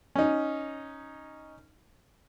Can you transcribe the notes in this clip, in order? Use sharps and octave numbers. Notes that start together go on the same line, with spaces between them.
C#4 D#4